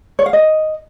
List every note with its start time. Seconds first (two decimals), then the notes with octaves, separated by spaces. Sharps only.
0.19 C#5
0.26 F5
0.33 D#5